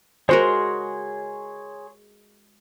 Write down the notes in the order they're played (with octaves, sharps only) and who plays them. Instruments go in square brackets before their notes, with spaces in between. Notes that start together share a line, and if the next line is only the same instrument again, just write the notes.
[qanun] G#3 F#4 A#4 [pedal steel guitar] G#4 C#5 C6 [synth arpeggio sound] C5